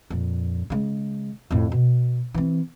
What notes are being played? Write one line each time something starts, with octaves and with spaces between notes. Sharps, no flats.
F2 A#2
C#3 G#3
F2 A2
B2
E3 C4